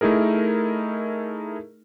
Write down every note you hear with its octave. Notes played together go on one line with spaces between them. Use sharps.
A3 D#4 E4 G#4 A#4